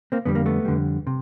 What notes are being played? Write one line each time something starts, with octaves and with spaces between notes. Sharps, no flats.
A#3 C4
F2 D3 G3 B3
A#3
A3 B3
F2 D3 G3
C3